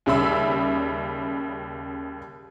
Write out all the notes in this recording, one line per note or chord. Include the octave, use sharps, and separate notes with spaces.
D#2 C#3 G3 E5 B5 E6